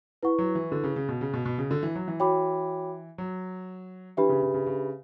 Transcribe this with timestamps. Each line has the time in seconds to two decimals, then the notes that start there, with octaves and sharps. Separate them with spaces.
0.23 E4 B4 F#5 C#6
0.38 F#3
0.55 E3
0.72 D3
0.84 C#3
0.96 C#3
1.09 B2
1.21 C#3
1.33 B2
1.45 B2
1.58 C#3
1.71 D3
1.83 E3
1.95 F#3
2.08 E3
2.20 F#4 C#5 G5 B5 D6
3.18 F#3
4.17 E3 D4 G4 B4 E5 B5
4.29 C#3
4.43 C#3
4.54 C#3
4.67 C#3